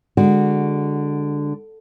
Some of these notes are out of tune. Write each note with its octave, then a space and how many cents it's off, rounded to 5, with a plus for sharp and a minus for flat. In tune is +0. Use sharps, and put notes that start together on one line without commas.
D3 +0 G#3 -20 F#4 +0